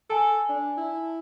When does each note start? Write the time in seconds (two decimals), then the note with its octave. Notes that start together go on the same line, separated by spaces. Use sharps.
0.10 A4 G#5 A5
0.49 D4
0.77 E4